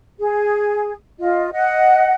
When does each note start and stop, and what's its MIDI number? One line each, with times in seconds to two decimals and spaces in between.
0.19 0.93 68
1.19 1.49 65
1.19 1.49 75
1.52 2.14 75
1.52 2.14 78